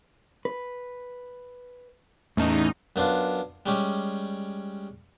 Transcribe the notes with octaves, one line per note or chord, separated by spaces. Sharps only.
B4
E2 A2 C#4 D#4 A5
F#2 B3 D4 F4
G3 G#3 C#4 G4